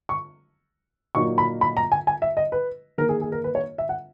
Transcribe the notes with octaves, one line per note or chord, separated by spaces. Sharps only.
C#6
A#2 F#3 A#3 D#4 C#6
B5
B5
A#5
G#5
G#5
E5
D#5
B4
D#3 A#3 D#4 A#4
G#4
G#4
A#4
B4
C#5
E5
F#5